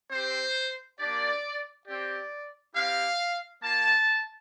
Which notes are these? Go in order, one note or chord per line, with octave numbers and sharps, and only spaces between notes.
C4 G4 C5
A#3 D4 G4 D5
C4 G4 D5
C4 E4 G4 F5
A#3 F4 A5